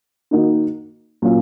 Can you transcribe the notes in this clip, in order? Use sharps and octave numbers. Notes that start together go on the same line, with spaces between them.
D#3 A#3 D#4 F#4
A#2 F#3 C#4 F4